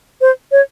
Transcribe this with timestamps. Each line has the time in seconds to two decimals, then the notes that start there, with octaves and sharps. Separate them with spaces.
0.21 C5
0.52 C#5